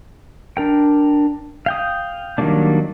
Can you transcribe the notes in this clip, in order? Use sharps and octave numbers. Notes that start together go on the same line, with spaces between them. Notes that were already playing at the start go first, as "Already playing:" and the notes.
D4 A#4 G5
F5 G5 D#6
D#3 F#3 G3 A#3 D4